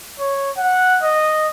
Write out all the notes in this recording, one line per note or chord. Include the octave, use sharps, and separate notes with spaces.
C#5
F#5
D#5